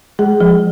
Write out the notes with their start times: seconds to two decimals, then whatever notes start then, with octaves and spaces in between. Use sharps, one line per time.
0.19 G#3 G#4
0.41 F3